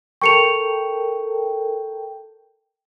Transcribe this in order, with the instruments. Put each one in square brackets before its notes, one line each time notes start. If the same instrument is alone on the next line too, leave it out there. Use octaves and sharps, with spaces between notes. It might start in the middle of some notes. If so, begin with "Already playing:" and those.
[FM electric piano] A4 A#4 G5 [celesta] C#6 C#7 F7